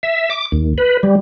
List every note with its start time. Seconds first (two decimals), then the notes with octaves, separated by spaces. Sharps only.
0.03 E5
0.30 D6
0.52 D#2
0.78 B4
1.03 G3